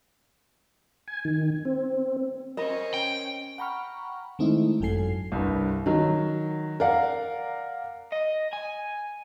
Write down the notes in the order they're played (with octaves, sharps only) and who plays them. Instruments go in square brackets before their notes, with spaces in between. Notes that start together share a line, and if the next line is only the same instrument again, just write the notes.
[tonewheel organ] G#5
D#3
C4
[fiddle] C4 C#4 [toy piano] A#4 B5 [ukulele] D#5
[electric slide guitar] G5
[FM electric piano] F#5 G5 A#5 B5 C#6 F6
D#3 G#3 A3 C4 D#4 E4
G#1 F#2 F#3 A4 G#5 C7
[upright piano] C2 G2
D#3 F#3
A#4 D5 F5 F#5
[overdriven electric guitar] D#5
G#5